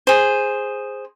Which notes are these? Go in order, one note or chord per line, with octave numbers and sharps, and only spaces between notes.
G#4 C5